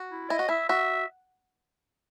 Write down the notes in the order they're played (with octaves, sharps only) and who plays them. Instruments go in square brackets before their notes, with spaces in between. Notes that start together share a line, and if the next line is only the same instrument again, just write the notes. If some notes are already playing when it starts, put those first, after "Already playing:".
Already playing: [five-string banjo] F#4
[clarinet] E4
[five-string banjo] E4 [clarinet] D#5
[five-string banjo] F#4
[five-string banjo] E4 [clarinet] E5
[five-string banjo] F#4 [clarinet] E5